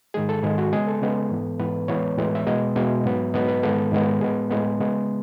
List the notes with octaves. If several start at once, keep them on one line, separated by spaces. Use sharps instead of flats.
G#2 D#3 G#3 G#4
A4
G#2 D#3 G#3 G#4
F#4
C#3 G#3 B3 G#4
A4
C#3 G#3 B3
G#2 E3 B3
G#2 E3 B3 B4
A2 E3 G#3 B3 C#5
A2 E3 G#3 B3
E5
B2 G#3 B3 D#5
B2 G#3 B3 E5
G#2 F#3 B3
G#2 F#3 B3 D#5
B4
G#2 D#3 G#3 B3 A4
G#2 D#3 G#3 B3
A2 G#3 B3 G#4
A2 G#3 B3
C#3 G#3 B3